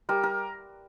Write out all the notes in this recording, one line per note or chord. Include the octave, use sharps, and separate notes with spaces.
G3 A#4
A#4